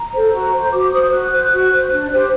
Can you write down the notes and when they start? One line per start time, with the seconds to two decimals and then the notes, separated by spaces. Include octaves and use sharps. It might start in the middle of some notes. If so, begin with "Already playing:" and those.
Already playing: A#5
0.12 A4 C5
0.33 F#4
0.52 C5
0.72 F#4 D6
0.92 C5 D#6
1.12 F#4 F#6
1.32 C5
1.52 F#4
1.71 C5
1.91 D4
2.12 G4 C5